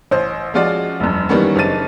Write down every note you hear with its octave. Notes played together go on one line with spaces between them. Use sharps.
A1 C5
F3 G#3 C#4 F4 F#4 D5
E1 F#2
D#3 E3 G3 A#3 B3 C#4
F#1 C#3 D4 D#4 A6 D#7